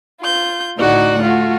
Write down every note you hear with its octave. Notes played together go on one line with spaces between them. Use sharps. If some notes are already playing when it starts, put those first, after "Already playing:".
F4 G6
D2 A2 D#4 F#4 D5 F#5
A3 F4 F#4